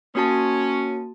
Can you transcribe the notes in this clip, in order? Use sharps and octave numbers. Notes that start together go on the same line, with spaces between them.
A#3 C#4 F#4 A5